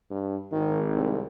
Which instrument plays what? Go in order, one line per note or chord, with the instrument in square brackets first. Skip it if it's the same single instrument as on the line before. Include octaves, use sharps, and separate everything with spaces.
[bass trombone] G2
[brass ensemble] G#1 [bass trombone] D#3
[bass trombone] C2